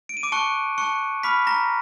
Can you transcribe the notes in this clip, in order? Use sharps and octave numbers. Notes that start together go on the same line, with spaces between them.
D7
D#7
D6 D7
A5 C#6 F#6 C#7
A5 C#6 F#6 C#7
B5 D6 F6 B6
A#5 A#6